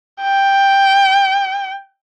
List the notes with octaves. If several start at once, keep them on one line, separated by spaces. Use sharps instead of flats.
G5